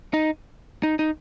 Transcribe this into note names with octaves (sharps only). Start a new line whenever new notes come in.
D#4
D#4
D#4